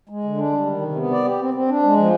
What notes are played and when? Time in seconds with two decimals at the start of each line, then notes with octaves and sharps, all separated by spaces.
0.09 G#3
0.24 D3
0.37 D4
0.52 G3
0.66 D#3
0.81 C3
0.96 B3
1.10 D5
1.24 G4
1.39 C4
1.54 C4
1.68 D4
1.83 G#3
1.98 F3